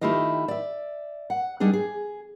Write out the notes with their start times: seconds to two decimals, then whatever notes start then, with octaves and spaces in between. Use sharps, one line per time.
0.01 D#3 A3 E4 F4 G4 D#5
0.48 D5 E5
1.30 F#5
1.60 G3 D4 D#4 G#4
1.73 G#4